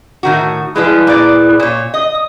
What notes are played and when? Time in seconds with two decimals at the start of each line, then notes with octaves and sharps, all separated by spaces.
0.23 A2 D#3 F#4
0.76 F3 G3 G#3 E4 G#4 B4
1.07 A#2 D5
1.59 A#2 C#5
1.94 D#5 D#6